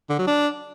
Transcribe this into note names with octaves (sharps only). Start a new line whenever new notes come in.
D3
F#3
D4